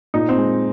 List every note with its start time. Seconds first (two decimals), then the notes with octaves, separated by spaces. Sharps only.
0.14 A#2 D#4
0.29 C4
0.37 G#3